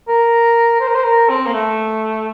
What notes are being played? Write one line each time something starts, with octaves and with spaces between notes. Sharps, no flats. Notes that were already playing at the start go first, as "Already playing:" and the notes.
A#4
C5
A#4
C5
A#4
C4
A#3
A3